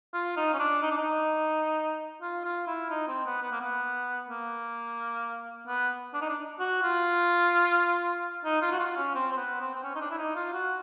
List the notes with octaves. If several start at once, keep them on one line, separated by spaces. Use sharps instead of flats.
F4
D#4
C#4
D4
D#4
D4
D#4
F4
F4
E4
D#4
C4
B3
B3
A#3
B3
A#3
B3
D4
D#4
D4
F#4
F4
D#4
F4
F#4
F4
C#4
C4
C4
B3
C4
C4
C#4
D#4
D4
E4
D#4
F4
F#4